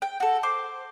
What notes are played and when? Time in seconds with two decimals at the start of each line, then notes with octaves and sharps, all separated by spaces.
0.02 G5
0.20 F#4 A4
0.43 C5 D6